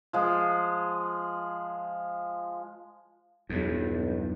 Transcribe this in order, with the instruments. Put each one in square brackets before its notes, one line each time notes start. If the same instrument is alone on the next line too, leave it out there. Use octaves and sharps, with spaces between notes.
[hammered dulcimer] F3 G#3
[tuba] B1 [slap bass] E2 G2